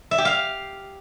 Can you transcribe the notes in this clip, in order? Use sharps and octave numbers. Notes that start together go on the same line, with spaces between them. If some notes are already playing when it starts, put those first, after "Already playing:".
E5
G4
F5